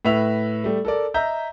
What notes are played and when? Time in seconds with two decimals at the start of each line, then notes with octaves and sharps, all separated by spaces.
0.05 A2 B4 E5 F7
0.64 G3 A3
0.85 A4 A#4 D5
1.14 D#5 E5 A#5 G6